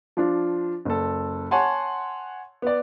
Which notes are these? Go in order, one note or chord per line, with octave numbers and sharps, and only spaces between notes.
F3 D4 F4
F#1 A4
C#5 F#5 G#5 A5 C6
B3 D5